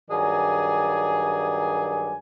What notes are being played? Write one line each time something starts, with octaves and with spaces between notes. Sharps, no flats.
G2 D#3 F#3 G#4 D5 G#5